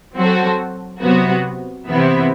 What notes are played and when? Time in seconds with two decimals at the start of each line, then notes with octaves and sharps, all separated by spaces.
0.16 F#3 C4 F#4 A4
1.02 C3 F#3 B3 F#4
1.89 C3 E3 B3 E4